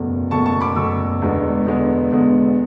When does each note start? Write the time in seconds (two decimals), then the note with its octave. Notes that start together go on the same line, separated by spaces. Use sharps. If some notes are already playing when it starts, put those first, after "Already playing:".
Already playing: F#1 E2 B2 A3
0.31 F#1 E2 B2 A3 A5 C#6
0.46 A5 C#6
0.61 B5 D6
0.75 F#1 E2 B2 A3 C#6 E6
1.21 E1 E2 D3 G#3 B3
1.66 E1 E2 D3 G#3 B3
2.11 E1 E2 D3 G#3 B3